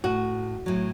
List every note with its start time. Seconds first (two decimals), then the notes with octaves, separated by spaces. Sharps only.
0.04 A2 F#4
0.66 A2 F#3